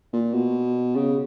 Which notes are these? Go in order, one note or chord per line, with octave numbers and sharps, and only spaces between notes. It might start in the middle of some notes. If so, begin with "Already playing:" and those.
A#2
B2
C#3